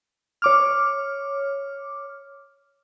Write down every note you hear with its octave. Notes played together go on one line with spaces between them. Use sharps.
C#5 D6 F6